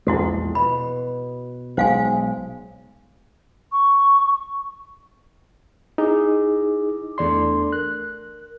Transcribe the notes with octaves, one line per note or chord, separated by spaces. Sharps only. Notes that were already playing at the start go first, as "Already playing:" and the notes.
A#1 E2 G#3 E4 F#4 A4
B2 B5
B1 G#3 C5 F5 G#5
C#6
D#4 E4 G#4 D6
E2 A3 D4 A4 D5 C6
A#4 F#6